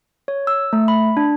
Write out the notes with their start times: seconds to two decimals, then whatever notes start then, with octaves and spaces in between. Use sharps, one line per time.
0.28 C#5
0.47 E6
0.73 A3
0.88 B5
1.17 D4